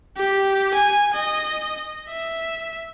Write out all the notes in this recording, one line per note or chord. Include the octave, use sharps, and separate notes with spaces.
G4
G#5
D#5
E5